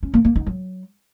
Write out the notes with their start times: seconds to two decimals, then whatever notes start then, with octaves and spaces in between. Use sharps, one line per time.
0.03 C#4
0.14 A#3
0.25 A#3
0.36 D#4
0.47 F#3